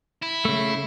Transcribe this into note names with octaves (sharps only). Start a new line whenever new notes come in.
E4
C#3 A3